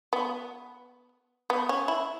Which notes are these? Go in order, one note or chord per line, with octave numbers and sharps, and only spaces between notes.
B3
B3
C#4
E4